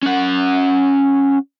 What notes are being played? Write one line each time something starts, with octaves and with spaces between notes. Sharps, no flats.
C#4 F#5